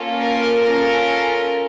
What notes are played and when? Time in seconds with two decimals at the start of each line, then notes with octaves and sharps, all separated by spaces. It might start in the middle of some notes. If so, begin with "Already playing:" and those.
Already playing: A#3 C#4 F4 A4
0.21 A#4
0.64 C#4 F4 A4 A#4